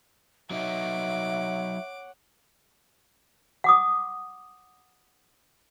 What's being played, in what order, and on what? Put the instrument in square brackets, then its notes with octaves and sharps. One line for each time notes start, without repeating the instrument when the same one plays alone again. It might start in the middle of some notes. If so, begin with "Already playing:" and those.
[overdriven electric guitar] F#3 D#4 [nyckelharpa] C#5 F#5 [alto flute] E5 [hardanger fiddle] D6
[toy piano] F#5 D6 D#6